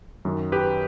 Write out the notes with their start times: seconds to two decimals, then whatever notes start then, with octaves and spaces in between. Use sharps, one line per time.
0.25 F#2 D#3 F#3
0.52 G4 B4